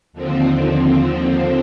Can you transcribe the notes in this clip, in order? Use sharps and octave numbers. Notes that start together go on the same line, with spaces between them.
D#2 D3 F3 C4